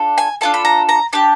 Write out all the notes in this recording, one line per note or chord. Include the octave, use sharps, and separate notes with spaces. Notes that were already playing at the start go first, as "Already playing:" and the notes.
Already playing: D4 F4 A4
G#5
D4 F4 A4 A5
B5
A#5
A#5
D4 G4 A5